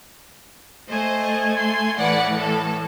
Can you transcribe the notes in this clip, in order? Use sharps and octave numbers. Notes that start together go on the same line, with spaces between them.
A3 C5 D#5 G#5
C6
A2 E3 B4 D5 F#5
A4